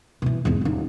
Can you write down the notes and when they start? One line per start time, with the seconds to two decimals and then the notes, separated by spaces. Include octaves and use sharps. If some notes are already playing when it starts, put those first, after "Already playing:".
0.22 B2 E3
0.45 E2 G#2
0.61 D#1 D#4